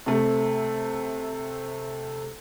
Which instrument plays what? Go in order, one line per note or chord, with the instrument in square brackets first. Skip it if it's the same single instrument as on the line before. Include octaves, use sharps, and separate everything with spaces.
[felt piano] C3 A3